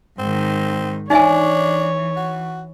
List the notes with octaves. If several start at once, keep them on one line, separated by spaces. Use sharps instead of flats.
G#2 D#3 C4
E3 D4 D#4 C#5 E5 G#5
F#4